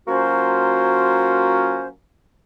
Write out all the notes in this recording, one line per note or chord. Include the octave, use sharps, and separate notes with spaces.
F#3 A#3 C#4 F4 F#4 C5